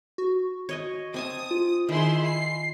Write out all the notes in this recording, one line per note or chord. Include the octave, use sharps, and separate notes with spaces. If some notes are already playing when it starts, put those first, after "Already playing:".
F#4
C#5 D#5 G#5
C4 G#5 A5 D#6
F4
D#3 E4 G#4 C6
C7